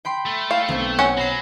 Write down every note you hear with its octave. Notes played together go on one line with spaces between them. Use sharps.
G5 B5 C6
A3
F5
B1 C4
C#4 F#5
F#3 B5 A#6 C7